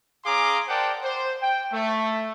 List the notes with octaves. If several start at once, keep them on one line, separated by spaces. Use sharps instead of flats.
C#4 G#4 F5 A#5 C6 D6
A#4 C5 D5 F#5 G5 A5
C5
G5
A3